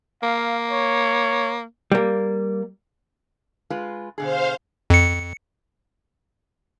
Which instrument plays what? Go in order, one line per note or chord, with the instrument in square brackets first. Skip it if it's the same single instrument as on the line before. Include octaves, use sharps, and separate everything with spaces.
[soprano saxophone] A#3 [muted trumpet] F5
[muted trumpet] C#5
[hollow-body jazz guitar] G3 A#3
[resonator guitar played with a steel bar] G#3 F4 B4
[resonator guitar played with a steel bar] B2 D3 G#4 [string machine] C5 F5
[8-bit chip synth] F2 C#7